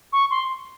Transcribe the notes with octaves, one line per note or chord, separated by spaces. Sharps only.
C#6
C6